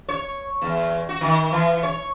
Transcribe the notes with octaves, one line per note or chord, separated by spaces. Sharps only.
C#5
E2
F#4
D#3
E3
C#5